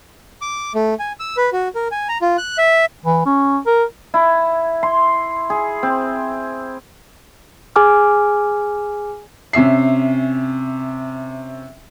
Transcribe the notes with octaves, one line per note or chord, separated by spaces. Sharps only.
D6
A3
G#5
E6
B4
F#4
A#4
G#5
A#5
F4
F#6
E5
E3
C#4
A#4
E4
C6
G#4
C4
G#4 G#5 D6 F6
C3 C#4 E5 C7